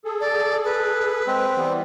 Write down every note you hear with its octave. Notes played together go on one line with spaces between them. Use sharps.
G#4 A4
D5
B4
G#3 C4
E3 G3 B3